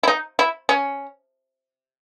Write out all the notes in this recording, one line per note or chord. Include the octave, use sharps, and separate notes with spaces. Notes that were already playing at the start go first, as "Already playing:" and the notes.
E4
D#4
E4
C#4